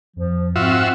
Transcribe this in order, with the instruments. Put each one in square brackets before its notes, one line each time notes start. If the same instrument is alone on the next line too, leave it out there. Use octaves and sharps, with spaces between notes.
[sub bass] F2 [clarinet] F3
[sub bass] G#2 [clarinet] C4 [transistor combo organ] F4 F#4 E5